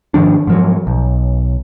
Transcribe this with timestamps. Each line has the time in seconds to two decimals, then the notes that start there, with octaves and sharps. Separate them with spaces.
0.14 G#2 D#3 F3 D4
0.47 G#2 F3 F#3
0.87 B1